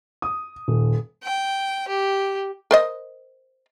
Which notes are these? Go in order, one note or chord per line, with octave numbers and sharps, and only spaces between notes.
D#6
D#1
G5
G4
A#4 C5 D#5